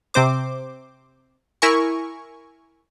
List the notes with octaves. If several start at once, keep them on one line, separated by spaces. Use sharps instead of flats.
C3 C4 C5 D6
E4 A#4 G#5 C#6